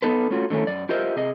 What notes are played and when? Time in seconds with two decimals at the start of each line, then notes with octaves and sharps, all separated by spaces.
0.02 B3 C#4 D#4 A4 B4
0.31 A3 C#4 F4 F#4
0.50 D3 D#3 A3 C#4 E4
0.67 F#2 D5
0.89 F4 G4 A#4 C5 D#5 E5
1.16 C3 G#4 D#5